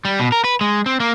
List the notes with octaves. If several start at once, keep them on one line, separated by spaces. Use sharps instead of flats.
G3
B2
A#4
B4
G#3
C4
A#3